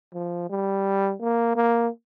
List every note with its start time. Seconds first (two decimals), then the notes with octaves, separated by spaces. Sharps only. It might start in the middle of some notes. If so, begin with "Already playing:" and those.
0.14 F3
0.50 G3
1.21 A#3
1.56 A#3